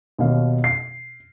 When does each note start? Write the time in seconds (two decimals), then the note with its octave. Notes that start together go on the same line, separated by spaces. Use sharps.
0.18 D#2 B2 F5
0.64 C7